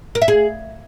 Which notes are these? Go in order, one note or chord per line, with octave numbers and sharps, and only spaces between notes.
A#4
E5
G#4